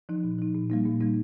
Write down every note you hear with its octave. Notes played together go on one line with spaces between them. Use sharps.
F3 D#4
A#2
F3 D#4
A#2
G3 A#3 D#4
A#2
G3 A#3 D#4